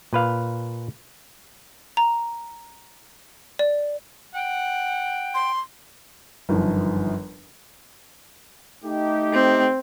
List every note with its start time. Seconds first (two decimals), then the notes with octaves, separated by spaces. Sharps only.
0.13 A#2 B4 F5
1.97 A#5
3.59 D5
4.34 F#5 G5
5.34 C6
6.49 G1 F#2 D#3 F3
8.85 A3 D#4 G4
9.33 C4